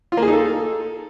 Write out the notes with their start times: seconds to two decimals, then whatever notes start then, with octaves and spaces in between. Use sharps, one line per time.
0.12 F4
0.17 A#3
0.22 G#4
0.28 D#4
0.33 A4